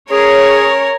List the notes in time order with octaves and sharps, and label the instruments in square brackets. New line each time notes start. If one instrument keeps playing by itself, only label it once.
[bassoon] C#4 [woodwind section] G#4 [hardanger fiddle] A#4 [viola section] C#5